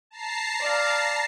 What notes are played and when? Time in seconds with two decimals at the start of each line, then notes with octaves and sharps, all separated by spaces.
0.11 A5 A#5 C7
0.60 D5 F5